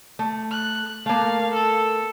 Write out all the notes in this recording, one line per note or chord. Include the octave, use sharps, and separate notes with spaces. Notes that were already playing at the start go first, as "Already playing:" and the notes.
A3
F#6
A3 A#3 F5
A4